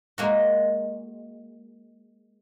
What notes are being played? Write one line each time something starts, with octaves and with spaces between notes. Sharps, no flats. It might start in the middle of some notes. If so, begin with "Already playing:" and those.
G#3 A#3 F#4